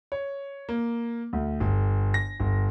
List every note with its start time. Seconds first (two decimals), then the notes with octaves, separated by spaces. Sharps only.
0.12 C#5
0.69 A#3
1.33 D2
1.60 G1
2.14 A#6
2.40 G1